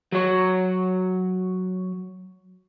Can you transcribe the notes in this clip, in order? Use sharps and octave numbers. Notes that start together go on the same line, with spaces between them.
F#3 C#5